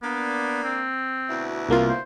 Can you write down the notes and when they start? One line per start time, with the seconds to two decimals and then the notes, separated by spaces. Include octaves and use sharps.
0.02 A#3 B3 D4
0.64 C4
1.28 D2 B2 E4
1.69 C2 A#3 F4
1.89 C5